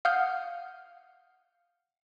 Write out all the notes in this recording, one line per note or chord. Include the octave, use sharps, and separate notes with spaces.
F5 F#5 D#6 F6 G6